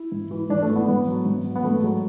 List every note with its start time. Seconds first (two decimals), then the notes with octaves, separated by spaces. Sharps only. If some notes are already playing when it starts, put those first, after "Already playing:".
Already playing: E4
0.12 G#2
0.31 E3
0.50 G#2 D4
0.62 A3
0.69 E3
0.76 B3
0.88 G#2 B3
1.08 F#3
1.26 G#2
1.45 F#3
1.56 B3
1.64 G#2 A3
1.83 F#3 G#3